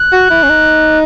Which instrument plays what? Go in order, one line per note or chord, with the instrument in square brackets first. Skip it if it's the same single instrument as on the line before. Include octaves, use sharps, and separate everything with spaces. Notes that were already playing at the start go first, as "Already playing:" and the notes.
Already playing: [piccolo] F#6
[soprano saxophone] F#4
E4
C#4
D#4